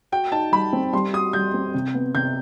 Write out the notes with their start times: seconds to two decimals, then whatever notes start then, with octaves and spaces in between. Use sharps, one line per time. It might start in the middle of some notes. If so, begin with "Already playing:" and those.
0.12 F#4 G5
0.32 D#4 A5
0.52 G3 B5
0.73 C4
0.93 G3 C6
1.13 F#4 D#6
1.33 G3 G6
1.54 C4
1.74 C3
1.94 B3
2.15 C3 G6